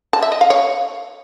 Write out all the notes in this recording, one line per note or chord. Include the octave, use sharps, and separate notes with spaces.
A5
E5
D#5
F5
C#5